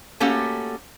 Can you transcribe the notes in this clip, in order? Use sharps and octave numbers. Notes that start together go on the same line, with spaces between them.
A3 A#3 C#4 F#4 G4 A4